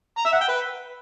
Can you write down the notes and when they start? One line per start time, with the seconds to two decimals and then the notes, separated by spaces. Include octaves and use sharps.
0.18 A#5
0.25 E5
0.33 F#5
0.41 G5
0.49 B4